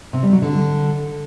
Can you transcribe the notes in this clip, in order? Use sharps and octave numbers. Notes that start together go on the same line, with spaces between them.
C3
G3
F#3
D3